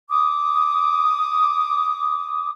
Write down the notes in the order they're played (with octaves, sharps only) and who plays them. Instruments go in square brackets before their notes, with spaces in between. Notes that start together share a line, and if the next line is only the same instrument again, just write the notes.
[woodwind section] D6 D#6